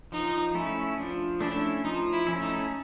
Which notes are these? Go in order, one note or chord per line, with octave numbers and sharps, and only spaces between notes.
F3 D#4
A3 C#4 E4
F3 D4
A3 C#4 D4 E4
F3 D#4
E4
A3 C#4 E4
D#4